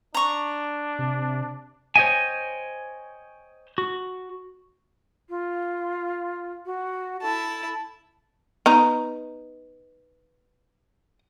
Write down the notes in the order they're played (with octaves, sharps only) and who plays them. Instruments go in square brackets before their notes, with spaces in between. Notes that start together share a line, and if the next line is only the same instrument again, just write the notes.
[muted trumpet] D4 [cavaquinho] A#5 C#6
[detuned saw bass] C3
[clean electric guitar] C5 C#5 D#5 E5 G5 G#5
F#4
[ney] F4
F#4
[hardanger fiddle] E4 A5 [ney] A4
[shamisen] B3 D#4 A#5